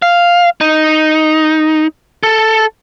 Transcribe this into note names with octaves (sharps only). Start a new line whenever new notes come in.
F5
D#4
A4